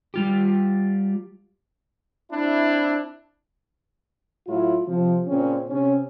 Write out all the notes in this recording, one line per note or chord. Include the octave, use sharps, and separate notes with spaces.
G3 F4 G4
C4 D4 E4
A2 F#3 E4 F4
C3 F3
A#2 C#3 C4 C#4
C3 C#4